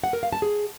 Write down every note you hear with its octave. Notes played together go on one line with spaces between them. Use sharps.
F#5
A#4
F5
A5
G#4